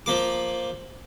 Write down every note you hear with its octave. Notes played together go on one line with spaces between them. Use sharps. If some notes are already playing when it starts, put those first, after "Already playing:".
F3 A#3 D6